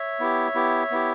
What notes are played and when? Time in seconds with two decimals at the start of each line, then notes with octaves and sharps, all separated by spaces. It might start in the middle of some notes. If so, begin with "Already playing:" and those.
Already playing: C#5 E5
0.20 B3 E4 G4
0.55 B3 E4 G4
0.91 B3 E4 G4